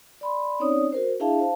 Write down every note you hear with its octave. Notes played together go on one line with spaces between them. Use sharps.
D5 B5 C6
C4 C#4 D#4 C#5 D5 D#6
F#4 A#4 C5
D4 E4 G#4 E5 F5 A5
C5 F5 A5